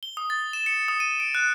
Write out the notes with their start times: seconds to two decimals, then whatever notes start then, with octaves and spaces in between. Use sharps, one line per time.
0.03 G7
0.17 D#6
0.30 A6
0.53 E7
0.66 C#7
0.88 D#6
1.00 D#7
1.20 D7
1.35 F#6